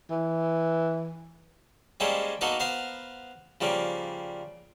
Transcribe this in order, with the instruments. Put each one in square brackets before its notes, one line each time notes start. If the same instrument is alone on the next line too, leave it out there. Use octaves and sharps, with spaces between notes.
[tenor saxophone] E3
[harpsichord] G3 G#3 A#3 C#4 A4 C5
A#3 B3 D#4 F#4 A4 A#4
B3 A#4 C5 F5
C#3 F3 G3 A#3